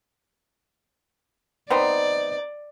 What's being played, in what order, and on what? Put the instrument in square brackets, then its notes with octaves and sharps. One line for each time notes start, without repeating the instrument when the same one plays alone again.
[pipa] B3 C4 D#4 [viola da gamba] D5